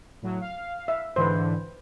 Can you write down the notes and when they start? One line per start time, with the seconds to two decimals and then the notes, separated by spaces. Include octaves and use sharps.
0.22 A2 F#3
0.41 F5
0.88 E5
1.16 G#2 D3 E3 B4 C5